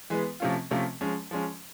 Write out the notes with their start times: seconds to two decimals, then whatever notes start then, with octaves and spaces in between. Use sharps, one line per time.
0.10 E3 G#3 B3
0.40 C3 F3 A3 C#4 F4
0.71 C3 F3 A3 C#4 F4
1.01 F3 G#3 C#4
1.31 F3 G#3 C#4